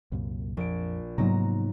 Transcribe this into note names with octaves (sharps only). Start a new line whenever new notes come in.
C2 F#2 A#2
A#1 F2 D7
G#2 C3 F#3 A#3 B3 A#5